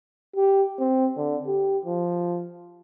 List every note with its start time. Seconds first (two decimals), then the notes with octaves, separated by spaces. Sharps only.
0.36 G4
0.79 C4
1.17 D3
1.47 G4
1.85 F3